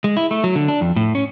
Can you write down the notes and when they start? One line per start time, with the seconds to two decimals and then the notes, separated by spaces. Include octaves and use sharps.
0.04 G#3
0.17 E4
0.31 A3
0.44 F#3
0.55 D3
0.68 D4
0.81 F2
0.96 A2
1.15 C#4